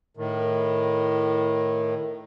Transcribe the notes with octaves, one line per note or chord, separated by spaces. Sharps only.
A2 D#3